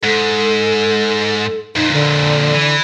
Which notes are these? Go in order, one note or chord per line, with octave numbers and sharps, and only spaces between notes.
G#2 A4
F2 A#2 D#4
D3
E3